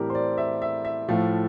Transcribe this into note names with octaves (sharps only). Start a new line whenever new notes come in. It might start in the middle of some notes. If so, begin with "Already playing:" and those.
Already playing: A2 E3 G3 C4 G4 A4 A#4
C5
D5
E5
E5
E5
A2 F3 A3 F5